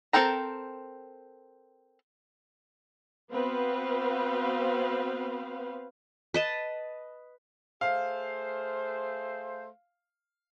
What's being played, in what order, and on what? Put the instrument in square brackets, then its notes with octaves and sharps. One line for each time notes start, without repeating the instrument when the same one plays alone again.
[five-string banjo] C4 A4 A#4 G5 A#5
[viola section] B3 C4 F#4 B4 C5 F5
[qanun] B4 D#5 A5
[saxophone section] A3 G#4 C5 [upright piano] F5